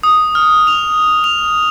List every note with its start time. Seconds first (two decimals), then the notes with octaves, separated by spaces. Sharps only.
0.03 D#6
0.35 F6
0.67 F7
1.24 F7